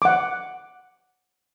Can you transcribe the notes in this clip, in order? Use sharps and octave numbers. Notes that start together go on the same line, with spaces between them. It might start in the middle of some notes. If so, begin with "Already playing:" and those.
F#5 D6